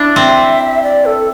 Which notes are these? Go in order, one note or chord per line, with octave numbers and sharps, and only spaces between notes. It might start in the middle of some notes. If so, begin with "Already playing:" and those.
Already playing: D4 E4
C4 E5
D5
A4